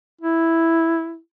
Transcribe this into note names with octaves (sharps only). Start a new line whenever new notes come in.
E4